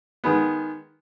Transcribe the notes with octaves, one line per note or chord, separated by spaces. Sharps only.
D#3 G#3 B3